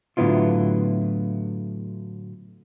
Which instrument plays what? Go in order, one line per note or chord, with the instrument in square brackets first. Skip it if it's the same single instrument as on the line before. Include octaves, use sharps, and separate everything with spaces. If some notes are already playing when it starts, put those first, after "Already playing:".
[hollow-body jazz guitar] A2 D3 F#3 B3 E4 F4